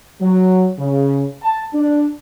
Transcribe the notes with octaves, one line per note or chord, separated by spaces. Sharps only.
F#3
C#3
A5
D4